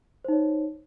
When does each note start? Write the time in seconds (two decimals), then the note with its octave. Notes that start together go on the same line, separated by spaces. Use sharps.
0.25 C5
0.28 D#4
0.32 C#5